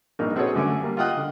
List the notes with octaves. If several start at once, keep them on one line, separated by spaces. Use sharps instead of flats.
A#1 G2 A#3 D#4
C4 F#4 G#4 A4 B4 C#5
F#2 D3 A3 G#5 D6
G3 A#3
F4 D#5 F#5 G5 D#6 F#6
D3